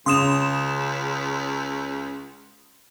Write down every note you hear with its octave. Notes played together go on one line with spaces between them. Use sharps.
C#2 C#3 C6 D#6 E7 F7